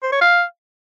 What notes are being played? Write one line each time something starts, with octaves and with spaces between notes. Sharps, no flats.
C5
C#5
F5